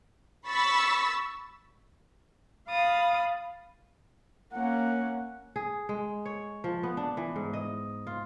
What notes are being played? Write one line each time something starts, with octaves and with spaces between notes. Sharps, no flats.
B5 C#6 E6 A6 B6
F5 B5 D#6 A6
A#3 C#4 F#5
G#4
G#3
C#5
F3
B3
D4
E3
G#2
D#5
F4